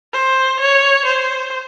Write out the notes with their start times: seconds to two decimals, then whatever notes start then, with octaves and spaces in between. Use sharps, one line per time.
0.13 C5
0.60 C#5
1.05 C5